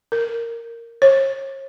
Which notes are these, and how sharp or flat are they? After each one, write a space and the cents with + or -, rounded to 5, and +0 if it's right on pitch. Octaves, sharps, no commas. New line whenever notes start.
A#4 -10
C#5 -40